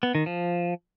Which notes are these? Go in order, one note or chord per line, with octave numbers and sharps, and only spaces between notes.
B3
D#3
F3